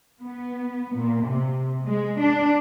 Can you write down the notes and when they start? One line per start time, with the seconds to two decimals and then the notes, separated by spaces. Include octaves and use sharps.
0.22 B3
0.96 A#2
1.27 C3
1.85 G#3
2.20 D4